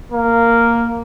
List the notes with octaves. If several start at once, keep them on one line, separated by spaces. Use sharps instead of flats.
A#3